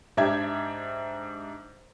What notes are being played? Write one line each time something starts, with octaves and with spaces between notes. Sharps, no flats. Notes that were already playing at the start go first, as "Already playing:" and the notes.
G#2 D4 G4 E5 G#6